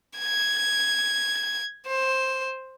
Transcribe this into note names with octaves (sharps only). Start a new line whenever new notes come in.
G#6
C5